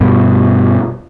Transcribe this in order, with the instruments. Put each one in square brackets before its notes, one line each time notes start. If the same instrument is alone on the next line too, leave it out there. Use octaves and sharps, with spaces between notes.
[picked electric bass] G2 B2